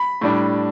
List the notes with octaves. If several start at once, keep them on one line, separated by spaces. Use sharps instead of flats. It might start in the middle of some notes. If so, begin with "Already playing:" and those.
Already playing: B5
A2 G3 D4